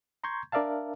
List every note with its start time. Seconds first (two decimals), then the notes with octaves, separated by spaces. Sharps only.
0.24 A#5 C6 C#6 G6 G#6
0.52 D4 A#4 D5 E5 F5 A5